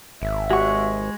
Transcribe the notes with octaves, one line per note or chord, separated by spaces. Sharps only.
G#1 E5
G#3 F#4 G4 C#6